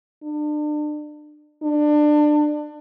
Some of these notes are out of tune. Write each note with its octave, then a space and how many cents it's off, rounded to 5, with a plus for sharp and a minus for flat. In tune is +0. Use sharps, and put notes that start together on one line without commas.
D4 +35
D4 +25